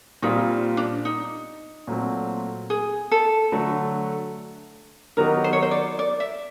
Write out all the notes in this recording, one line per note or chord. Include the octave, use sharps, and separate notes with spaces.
A#2 G3 C4 D#4 F4
D4
D#4
A#2 F#3 A3 C4
G#4
A4
D3 F#3 A3
D#3 F#3 B3 D#4 G4 A#4
C5
C#5
C5
D5
D5
E5